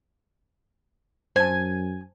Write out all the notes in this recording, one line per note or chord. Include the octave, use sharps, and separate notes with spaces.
F#2 C5 G#5 A5